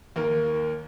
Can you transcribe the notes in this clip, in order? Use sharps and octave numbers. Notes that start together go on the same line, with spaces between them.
D#2 A#3 A#4